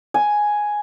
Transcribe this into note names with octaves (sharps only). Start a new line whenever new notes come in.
G#5